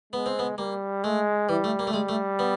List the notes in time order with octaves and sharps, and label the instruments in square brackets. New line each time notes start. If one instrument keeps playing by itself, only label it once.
[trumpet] G#3 [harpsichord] B3
[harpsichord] C4
B3
[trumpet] G3 [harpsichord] A#3
[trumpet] G#3 [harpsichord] A3
[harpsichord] E3 [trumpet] G3
[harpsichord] A3
A#3
A3
[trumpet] G3 [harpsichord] G#3
[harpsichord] A3
B3